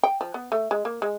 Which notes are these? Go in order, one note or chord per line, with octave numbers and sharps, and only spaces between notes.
G5
F3
B3
A3
G#3
A#3
G#3